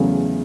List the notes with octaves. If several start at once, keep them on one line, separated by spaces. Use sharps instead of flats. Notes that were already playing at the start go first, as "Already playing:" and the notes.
Already playing: E2 C#3 F#3 A3